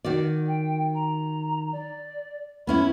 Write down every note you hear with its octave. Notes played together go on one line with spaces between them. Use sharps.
D#3 F#4 D5
G5
A#5
D5
B3 C#4 E4 B5